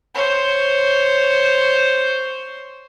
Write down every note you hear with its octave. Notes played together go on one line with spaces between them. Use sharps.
C5 C#5